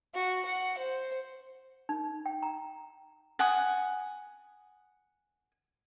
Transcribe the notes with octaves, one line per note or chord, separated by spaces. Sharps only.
F#4
F#5
C5
D#4
G5
A#5
F#5 G#5 D#6